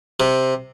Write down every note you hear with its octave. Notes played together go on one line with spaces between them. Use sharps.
C3